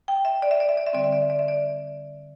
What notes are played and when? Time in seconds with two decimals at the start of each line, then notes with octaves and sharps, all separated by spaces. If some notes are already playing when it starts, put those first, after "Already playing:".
0.08 G5
0.25 E5
0.42 D5
0.51 E5
0.60 D5
0.69 E5
0.77 D5
0.86 E5
0.93 D3 G3 C4 D5
1.04 E5
1.13 D5
1.22 E5
1.30 D5
1.39 E5
1.48 D5